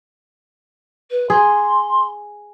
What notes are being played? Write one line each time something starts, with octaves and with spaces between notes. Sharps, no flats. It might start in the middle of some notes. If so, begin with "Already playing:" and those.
B4
G#4 C6